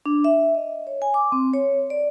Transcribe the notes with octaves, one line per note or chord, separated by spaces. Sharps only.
D4
E5
D#5
C#5
G#5
D6
C4
C#5
D5